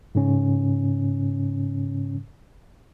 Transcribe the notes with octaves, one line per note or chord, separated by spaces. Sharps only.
G#2 C#3 C#4